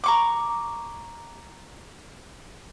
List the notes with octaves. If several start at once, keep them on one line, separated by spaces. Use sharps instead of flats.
A#5 C#6 D6